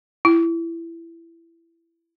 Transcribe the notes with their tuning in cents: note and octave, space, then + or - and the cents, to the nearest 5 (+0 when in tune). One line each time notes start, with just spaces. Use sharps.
E4 +20